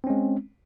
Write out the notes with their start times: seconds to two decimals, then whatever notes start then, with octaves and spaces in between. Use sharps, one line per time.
0.04 C4
0.07 C#4
0.10 G#3